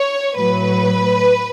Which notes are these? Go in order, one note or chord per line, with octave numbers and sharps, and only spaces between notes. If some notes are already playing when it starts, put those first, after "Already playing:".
Already playing: C#5
A2 F#3 B4